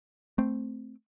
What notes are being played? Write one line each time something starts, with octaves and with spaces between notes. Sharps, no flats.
A3 C4